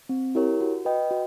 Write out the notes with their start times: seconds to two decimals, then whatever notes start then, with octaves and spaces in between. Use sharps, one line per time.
0.09 C4
0.35 E4 G4 A#4 C#5
0.61 F#4
0.85 B4 D#5 G5
1.11 F#4